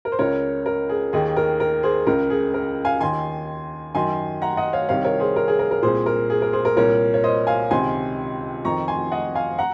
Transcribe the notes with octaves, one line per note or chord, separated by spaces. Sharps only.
A#4
C5
C#2 C#3 A#4 C#5
A#4
G#4
D#2 D#3 G#4
A#4
A#4
G#4 C5
C#2 C#3 A#4
G#4
A#4
F5 G#5
D#2 D#3 G#5 C6
F#2 D#3 G#5 C6
F#5 A#5
D#5 F#5
C#5 F5
C2 C3 D#3 C#5 F5
A#4 C#5
G#4 C5
A#4
G#4
A#4
A#4
C2 A#2 G#4 C5
A#4
G#4
A#4
G#4 C5
A#4
C2 A#2 A#4 C#5
C#5
C5 D#5
F5 G#5
C#2 C3 D#3 G#5 C6
F2 D#3 A#5 C#6
G#5 C6
D#5 F#5
F5 G#5
F#5 A#5